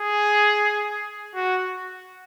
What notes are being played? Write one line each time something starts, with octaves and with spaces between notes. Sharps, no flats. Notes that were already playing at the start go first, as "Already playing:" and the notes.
Already playing: G#4
F#4